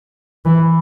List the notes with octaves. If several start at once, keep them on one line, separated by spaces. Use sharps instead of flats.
E3